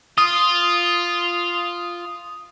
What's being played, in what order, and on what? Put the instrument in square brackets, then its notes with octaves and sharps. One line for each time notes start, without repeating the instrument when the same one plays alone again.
[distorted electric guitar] F4 [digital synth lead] D#6